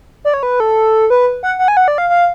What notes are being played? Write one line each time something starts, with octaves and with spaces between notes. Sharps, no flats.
D5
C#5
B4
A4
B4
F#5
F#5
G#5
F#5
D5
F5
F5